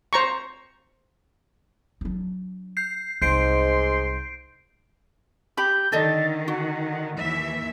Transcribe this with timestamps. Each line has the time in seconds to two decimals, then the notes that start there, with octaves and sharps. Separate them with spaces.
0.13 C5 A#5 C#6
2.01 F#3 D4
2.77 G6 C7
3.22 C2 G#2 C6 G6 C7 D7
5.57 G4 B5 G6
5.92 D3 D#3 A4 D5 D#5 A6
6.48 F#4 F#5
7.18 D#2 E3 E5